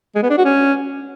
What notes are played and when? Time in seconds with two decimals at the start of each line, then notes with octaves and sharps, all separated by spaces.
0.15 G#3
0.23 B3
0.30 D4
0.38 F#4
0.45 C#4